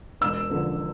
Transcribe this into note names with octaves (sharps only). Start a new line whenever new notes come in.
E1 E6
E2 D3 F3